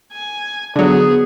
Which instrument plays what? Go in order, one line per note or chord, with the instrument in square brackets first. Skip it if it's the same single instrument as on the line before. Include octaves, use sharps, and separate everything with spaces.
[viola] G#5
[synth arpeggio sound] D3 F#3 [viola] B3 G#4